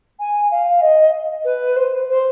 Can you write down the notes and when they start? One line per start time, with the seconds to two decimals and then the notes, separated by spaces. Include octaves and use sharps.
0.19 G#5
0.51 F5
0.82 D#5
1.45 B4
1.76 C5
2.09 C5